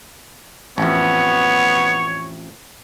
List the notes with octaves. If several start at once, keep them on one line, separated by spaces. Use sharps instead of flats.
A1 F2 B3 C#5